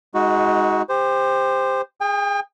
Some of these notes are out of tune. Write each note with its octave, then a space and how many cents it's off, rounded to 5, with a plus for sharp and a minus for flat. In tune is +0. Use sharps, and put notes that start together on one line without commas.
G#3 -5 D#4 +30 F#4 +0
G4 +25 C5 -5
G#4 -10 G5 +40